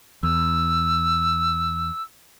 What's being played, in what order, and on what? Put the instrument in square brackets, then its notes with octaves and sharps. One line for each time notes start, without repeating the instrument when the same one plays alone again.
[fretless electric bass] E2 [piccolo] E6